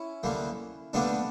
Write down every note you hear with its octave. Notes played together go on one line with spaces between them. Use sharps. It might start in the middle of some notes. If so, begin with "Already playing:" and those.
Already playing: C#4 E4
D2 D3 G3 A#3
D2 D3 G3 A#3 B3 D4